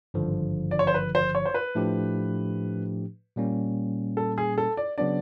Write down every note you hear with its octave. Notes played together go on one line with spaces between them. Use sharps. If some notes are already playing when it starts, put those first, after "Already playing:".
G#1 G2 D3 F3
D5
C#5
C5
B4
C5
C#5
C5
B4
A2 F3 A3 D4 G4
A#2 G3 A#3 C#4
A4
G#4
A4
D5
C#3 F#3 B3 D4 D5